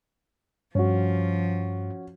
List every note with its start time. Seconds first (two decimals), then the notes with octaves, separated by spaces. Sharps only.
0.75 G2 F3 C#4 F#4